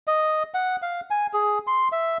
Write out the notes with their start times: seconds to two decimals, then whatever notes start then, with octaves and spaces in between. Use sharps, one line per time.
0.07 D#5
0.54 F#5
0.82 F5
1.10 G#5
1.33 G#4
1.67 C6
1.92 E5